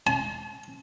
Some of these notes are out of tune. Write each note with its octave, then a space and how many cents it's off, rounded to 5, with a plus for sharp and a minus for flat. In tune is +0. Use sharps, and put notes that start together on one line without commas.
A5 -45